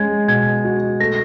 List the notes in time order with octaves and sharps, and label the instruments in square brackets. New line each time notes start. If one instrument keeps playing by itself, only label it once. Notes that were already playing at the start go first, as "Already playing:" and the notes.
Already playing: [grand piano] G#3 C#4 [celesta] G#6
[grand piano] B2 [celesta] G#6
[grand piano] F#4
[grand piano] A3 [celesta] A#6